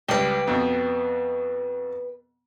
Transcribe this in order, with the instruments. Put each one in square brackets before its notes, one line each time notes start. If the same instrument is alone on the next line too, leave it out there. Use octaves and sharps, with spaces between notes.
[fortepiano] C#2 G3 [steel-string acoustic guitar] B4 G5
[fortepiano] F2 B2